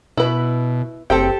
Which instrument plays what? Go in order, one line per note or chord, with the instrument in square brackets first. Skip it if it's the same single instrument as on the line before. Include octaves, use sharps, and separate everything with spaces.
[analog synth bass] B2 [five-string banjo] E4 B4
[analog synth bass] F#1 [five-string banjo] C4 G5 [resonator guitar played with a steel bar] G4 A4